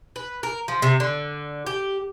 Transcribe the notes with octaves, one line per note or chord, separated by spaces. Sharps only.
B4
A#4
F3
C3
D3
G4